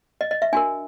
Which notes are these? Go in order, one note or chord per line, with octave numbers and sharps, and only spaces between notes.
D#5
D#5
E5
D4 F#4 A#4 G#5